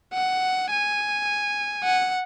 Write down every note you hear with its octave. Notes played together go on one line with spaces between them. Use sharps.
F#5
G#5
F#5